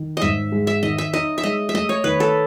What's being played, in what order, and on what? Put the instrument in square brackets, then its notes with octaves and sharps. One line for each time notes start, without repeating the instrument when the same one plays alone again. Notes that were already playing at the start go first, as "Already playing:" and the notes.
Already playing: [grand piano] D#3
[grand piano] G#2 [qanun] D#5 E5
[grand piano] G#3
[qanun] E5
[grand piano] D#3 [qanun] D#5
[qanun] E5
[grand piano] D#4 [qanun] D#5
[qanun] E5
[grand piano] G#3 [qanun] D#5
[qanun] E5
[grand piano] A3 [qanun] D#5
[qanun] C#5
[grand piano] D#3 [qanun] B4
[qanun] A4